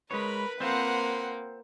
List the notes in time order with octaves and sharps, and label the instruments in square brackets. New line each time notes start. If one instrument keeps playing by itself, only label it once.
[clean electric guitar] G#3 C#5 [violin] A#4 B5 [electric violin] B4
[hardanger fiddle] A#3 [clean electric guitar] C4 F4 C5 [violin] F#5 C6